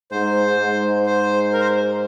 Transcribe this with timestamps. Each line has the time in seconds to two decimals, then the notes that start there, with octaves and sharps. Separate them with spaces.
0.11 G#2 C5
0.58 G#2
1.06 C5
1.53 A#4
1.61 C5